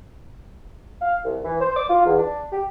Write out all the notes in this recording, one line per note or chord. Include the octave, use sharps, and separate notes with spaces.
F5
C2
E3
C5
D6
F4
E2
D4
G4